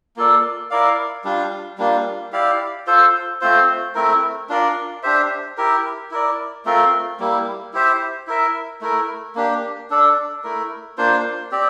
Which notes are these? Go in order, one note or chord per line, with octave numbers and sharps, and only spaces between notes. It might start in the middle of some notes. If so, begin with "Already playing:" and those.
A#3 F4 A4 D5
E4 A#4 D5 F5
G3 D4 F4
G3 A#3 D4 F4
E4 G4 D5 F5
F4 A4 C5
A3 C4 F4 C5
A3 C4 E4 A#4
D4 F4 A#4 D5
D4 G4 C5 E5
E4 G4 A#4
E4 A#4 D5
A3 C4 F4 A#4
G3 A#3 E4
E4 G4 C5 E5
E4 A#4 E5
A3 E4 A#4
A#3 D4 G4
D4 A4 D5
A3 E4 A#4
A#3 D4 F4 C5
C4 G4 D5